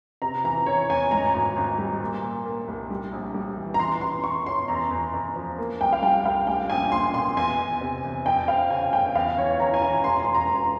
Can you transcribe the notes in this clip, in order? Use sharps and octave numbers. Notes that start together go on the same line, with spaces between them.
C3 A#5
E3 A#5
E3 C#5
E2 G#5
G#2 A#5
G#1
G#1
G3
A#2
A#2
A#3
C2
G3
A#1
G3
E3
A#5
E3 C6
E3 C6
E3 C#6
C#4 C6
E2 A#5
E2
E2
F3
A#3
C2 G5
F5
G3 G5
C2 F5
G3 G5
A#1 G#5
A#1 C6
A#2 C6
E2 G#5
E2
C3
E2
F2 G5
F2 F5
C#3 G#5
G1 G5
E2 F5
E3 C#5
E3 A#5
G#5
E3 A#5
E1 C6
E1 C6
A#5
E1